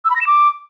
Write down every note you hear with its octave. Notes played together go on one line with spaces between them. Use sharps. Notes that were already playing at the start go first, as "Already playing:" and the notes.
E6
B5
A#6
E7
D6